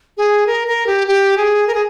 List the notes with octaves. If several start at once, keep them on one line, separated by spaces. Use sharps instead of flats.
G#4
A#4
A#4
G4
G4
G#4
A#4
G#4